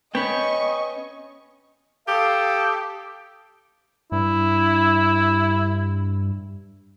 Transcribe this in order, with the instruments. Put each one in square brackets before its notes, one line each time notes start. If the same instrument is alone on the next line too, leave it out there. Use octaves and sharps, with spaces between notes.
[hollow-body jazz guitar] B3 C#4 [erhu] D#5 [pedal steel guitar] G5 B5 [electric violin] C#6
[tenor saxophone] G4 [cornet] A4 [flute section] F5 D#6
[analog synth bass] G2 [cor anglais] E4